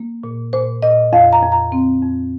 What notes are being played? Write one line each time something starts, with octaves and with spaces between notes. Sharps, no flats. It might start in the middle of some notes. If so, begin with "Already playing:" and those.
Already playing: A#3
A#2
A#2 C5
A#2 D#5
F2 F5
A#5
F2
A#5
C4
F2